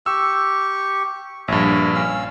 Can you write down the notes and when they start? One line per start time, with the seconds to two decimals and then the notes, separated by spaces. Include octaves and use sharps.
0.06 G4 C#6 E6
1.48 A#1 G2 C#5 E5
1.95 C#4 F5 E6